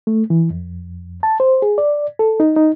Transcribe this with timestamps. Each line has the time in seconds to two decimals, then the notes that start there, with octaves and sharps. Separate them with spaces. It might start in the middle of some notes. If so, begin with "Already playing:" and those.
0.07 A3
0.30 E3
0.50 F2
1.23 A5
1.40 C5
1.62 G#4
1.78 D5
2.19 A4
2.40 D#4
2.57 D#4